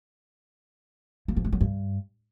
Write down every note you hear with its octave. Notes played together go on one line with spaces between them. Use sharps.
A#3
F3
G#3
F#3
G2